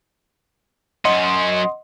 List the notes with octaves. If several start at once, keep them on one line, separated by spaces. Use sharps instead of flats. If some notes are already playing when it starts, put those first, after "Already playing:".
F#2 C#4 D#5 F#5 C6